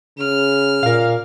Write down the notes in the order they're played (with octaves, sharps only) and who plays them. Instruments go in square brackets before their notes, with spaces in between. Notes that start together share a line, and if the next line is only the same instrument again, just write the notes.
[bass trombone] C#3 [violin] F6
[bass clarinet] A#2 [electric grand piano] A#4 F5